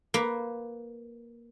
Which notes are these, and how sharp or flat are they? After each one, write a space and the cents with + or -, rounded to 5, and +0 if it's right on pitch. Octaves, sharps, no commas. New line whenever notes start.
A#3 +10 B4 +10